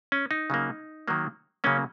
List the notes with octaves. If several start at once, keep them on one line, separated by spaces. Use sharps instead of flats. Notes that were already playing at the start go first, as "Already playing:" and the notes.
C#4
D#4
C#3 F#3 A#3
D#3 F#3 A#3
C#3 F#3 A#3 C#4